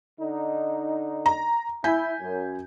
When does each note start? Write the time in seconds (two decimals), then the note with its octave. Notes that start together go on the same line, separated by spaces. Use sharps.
0.19 D3 D#4
1.26 A#5
1.84 E4 G#5 G6 B6
2.20 F#2